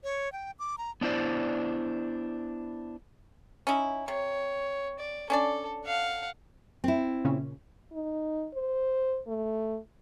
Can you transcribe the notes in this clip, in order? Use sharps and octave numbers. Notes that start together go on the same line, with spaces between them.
C#5
G5
D6
A#5
B3 D4 E4 C5 D5
C#4 D#4 E4
C3 C#5
D5
C#4 D4 A4 D5
F5 F#5
C4 E4
A#2 C#3 C#4
D#4
C5
A3